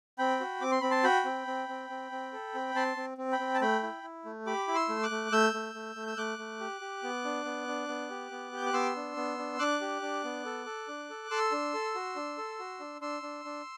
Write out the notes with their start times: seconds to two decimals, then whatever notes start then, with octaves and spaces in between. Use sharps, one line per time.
0.18 C4 G5 B5
0.40 F#4
0.61 C4 D6
0.72 C6
0.81 C4 B5
0.91 A5 C6
1.04 F#4 G5 B5
1.25 C4
1.47 C4
1.69 C4
1.90 C4
2.12 C4
2.33 A4
2.55 C4
2.75 C4 A5 C6
2.97 C4
3.18 C4
3.32 G5 B5
3.40 C4
3.54 A5
3.61 A3 G5 B5
3.83 E4
4.03 E4
4.25 A3
4.46 G4 B5 D6
4.68 E4
4.75 C6 E6
4.89 A3
5.03 D6 F#6
5.11 A3
5.32 A3 E6 G6
5.54 A3
5.74 A3
5.96 A3
6.07 E6
6.17 A3 D6 F#6
6.39 A3
6.60 G4
6.81 G4
7.03 B3
7.25 D4
7.45 B3
7.68 D4
7.88 B3
8.10 G4
8.31 B3
8.52 G4 G6
8.66 F#6
8.73 B3 C6 E6
8.96 D4
9.17 B3
9.38 D4
9.59 D4 D6 F#6
9.81 G4
10.02 D4
10.24 B3
10.45 A4
10.66 A4
10.88 D4
11.10 A4
11.31 A4 C6 E6
11.52 D4
11.74 A4
11.95 F#4
12.16 D4
12.38 A4
12.59 F#4
12.80 D4
13.01 D4 C6 E6
13.22 D4
13.45 D4